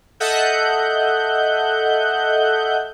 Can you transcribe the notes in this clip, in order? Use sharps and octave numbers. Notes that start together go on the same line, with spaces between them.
A4 D#5 E5 F#5 F#6 G6